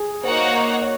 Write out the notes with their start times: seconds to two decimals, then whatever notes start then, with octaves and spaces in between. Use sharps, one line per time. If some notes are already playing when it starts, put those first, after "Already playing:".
Already playing: G#4
0.23 A#3 D#4 F#4 C5 C#5 F#5
0.82 C#5